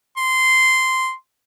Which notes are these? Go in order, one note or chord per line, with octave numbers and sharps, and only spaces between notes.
C6